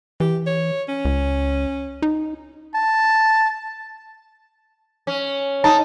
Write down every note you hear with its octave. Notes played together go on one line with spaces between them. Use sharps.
E3 G4
C#5
C#4
C#2
D#4
A5
C#4
D#4 A5